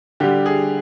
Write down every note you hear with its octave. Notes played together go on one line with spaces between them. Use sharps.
D3 G3 G4
G#4